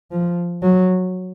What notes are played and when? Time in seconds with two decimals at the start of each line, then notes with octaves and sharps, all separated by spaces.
0.11 F3
0.62 F#3